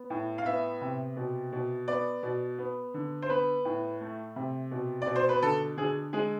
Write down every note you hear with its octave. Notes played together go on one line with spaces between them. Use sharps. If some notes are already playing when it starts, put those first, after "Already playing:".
Already playing: B3
A2
F5
B3 E5
C3
B2
B2
B3 D5
B2
B3
D3
C5
B3 B4
A2
A3
C3
B2
D5
B2
C5
B4
D3 A4
D3 G#4
G#3 G#4